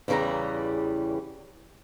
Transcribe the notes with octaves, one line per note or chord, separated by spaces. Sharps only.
E2 C#3 E3 G3 A#5